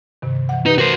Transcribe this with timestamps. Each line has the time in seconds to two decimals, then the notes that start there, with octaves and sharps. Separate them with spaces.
0.22 G2 C3 D#3
0.49 E3 F#5
0.66 D#4 G4 B4
0.78 F#4 A#4 C5